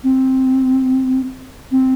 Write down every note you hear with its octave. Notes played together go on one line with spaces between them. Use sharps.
C4
C4